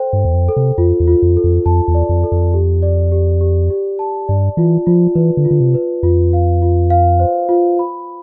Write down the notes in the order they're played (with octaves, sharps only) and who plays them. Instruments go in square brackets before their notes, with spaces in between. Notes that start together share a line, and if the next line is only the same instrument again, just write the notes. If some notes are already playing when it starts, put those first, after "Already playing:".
Already playing: [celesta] A4 C5 G5
[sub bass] G2
[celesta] C5
[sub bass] E2
F2
[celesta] A4
[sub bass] C3
[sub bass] F2 [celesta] F4
[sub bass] E2
[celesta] F4
[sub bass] F2
[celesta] A4
[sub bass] F2
[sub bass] F2 [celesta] A5
[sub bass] E2
[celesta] D5
[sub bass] F2
[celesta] A4
[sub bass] F2
[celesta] G4
D5
G4
G4
G4
A5
[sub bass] G2 [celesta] D5
[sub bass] E3 [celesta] F4
[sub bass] F3 [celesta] F4
[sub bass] E3 [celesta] B4
[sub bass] D3
[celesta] F4
[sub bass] D3
C3
[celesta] B4
[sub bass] F2 [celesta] F4
[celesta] F5
F4
F5
C5
F4
B5